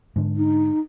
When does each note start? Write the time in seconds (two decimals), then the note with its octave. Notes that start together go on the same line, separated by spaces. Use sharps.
0.16 G#2 D3
0.37 D#4